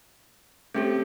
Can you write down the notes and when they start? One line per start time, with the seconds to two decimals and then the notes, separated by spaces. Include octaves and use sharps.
0.74 A3 C4 C#4 G4 A4